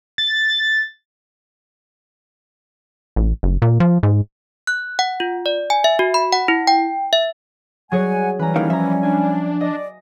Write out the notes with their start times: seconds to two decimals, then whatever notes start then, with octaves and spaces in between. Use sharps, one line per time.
0.18 A6
3.16 A1
3.43 F#1
3.62 A#2
3.80 F3
4.03 G#2
4.67 F#6
4.99 F#5
5.20 F4
5.46 D5
5.70 G#5
5.84 E5
5.99 F#4
6.14 B5
6.33 F#5
6.48 E4
6.67 G5
7.13 E5
7.92 F#3 G3 G#4 C#5 F#5 G#5
8.39 E3 G3 C#4 B4 A#5
8.56 D#2 D#3 F5
8.70 F3 E5 A#5
9.03 D4 G#5
9.61 D5 D#5